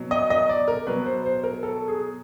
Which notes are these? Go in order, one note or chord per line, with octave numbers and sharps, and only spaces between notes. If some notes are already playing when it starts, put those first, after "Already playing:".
Already playing: B2 F#3
D#5
D#5
D5
A#4
B2 F#3 B4
C5
C5
A#4
A4
G#4